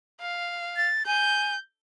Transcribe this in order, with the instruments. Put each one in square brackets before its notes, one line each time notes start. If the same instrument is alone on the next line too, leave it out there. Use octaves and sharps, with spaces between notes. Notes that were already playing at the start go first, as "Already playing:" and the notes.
[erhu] F5
[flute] A6
[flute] G#5 [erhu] G6